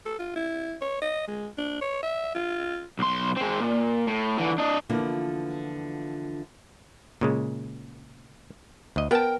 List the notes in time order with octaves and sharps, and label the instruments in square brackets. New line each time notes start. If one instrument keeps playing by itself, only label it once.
[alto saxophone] A4
F4
E4
C#5
D#5
G#3
D4
C#5
E5
F4
[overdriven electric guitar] B1 C6
G#3 C4
A#2
A2
D3 E3
D4 D#5
[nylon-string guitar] D3 E3 F3 A#3 B3 F4
[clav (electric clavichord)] A#2 C#3 G#3
D2 D#5
[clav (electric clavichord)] B3 A5 [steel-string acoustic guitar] A#4 G5